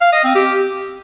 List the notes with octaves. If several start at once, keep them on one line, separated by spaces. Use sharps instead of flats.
F5
D#5
C4
G4